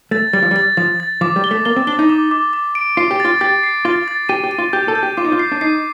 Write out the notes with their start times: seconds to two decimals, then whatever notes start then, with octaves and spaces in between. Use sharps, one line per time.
0.11 A3 A6
0.33 G3 A6
0.43 F3
0.51 G3
0.56 A6
0.77 F3 A6
1.00 A6
1.21 F3 D6
1.36 G3
1.44 G7
1.51 A3
1.65 A#3 G7
1.76 C4
1.87 D4 G7
1.99 D#4
2.09 D6
2.31 D6
2.53 D6
2.75 D7
2.97 F4 C7
3.11 G4
3.20 F4 A6
3.41 G4 A6
3.63 C7
3.85 F4 A6
4.08 A6
4.29 G4 D#7
4.44 G4
4.51 D#7
4.58 F4
4.73 G4 G6
4.88 A4
4.95 G6
5.03 G4
5.17 F4 D6
5.25 D#4
5.32 F4
5.39 C7
5.52 D4
5.61 D#4 C7